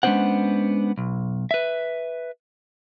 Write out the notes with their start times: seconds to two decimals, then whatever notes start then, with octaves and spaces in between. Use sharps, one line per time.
0.03 G#3 B3 C#4 D4 C5 F#5
0.98 B1
1.51 B4 E5